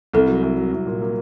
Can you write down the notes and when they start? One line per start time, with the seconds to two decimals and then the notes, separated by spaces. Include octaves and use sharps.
0.13 C2 A4
0.28 F#3
0.42 C2
0.57 F#3
0.72 C2
0.87 A#2
1.02 A#3